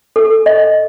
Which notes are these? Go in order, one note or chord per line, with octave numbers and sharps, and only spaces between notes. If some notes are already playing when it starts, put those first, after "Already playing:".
A4
D#5